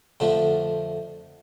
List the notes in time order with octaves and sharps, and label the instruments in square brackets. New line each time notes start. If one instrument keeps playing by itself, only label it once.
[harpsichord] F2 D3 F3 A3